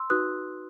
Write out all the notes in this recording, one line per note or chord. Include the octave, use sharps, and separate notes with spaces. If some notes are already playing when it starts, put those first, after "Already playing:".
Already playing: C6 E6
D#4 F#4 B4 D#6 F#6